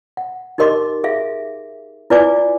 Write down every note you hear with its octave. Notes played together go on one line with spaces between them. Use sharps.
F#5
D#4 G4 A#4 D#5 C6 D6
G#4 E5 F5
E4 F4 B4 D5 G#5 D6